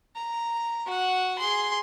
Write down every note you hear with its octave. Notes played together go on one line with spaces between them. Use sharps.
A#5
F#4 F#5
G#4 C6